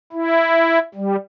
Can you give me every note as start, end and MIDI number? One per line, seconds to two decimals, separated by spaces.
0.13 0.79 64
0.95 1.16 55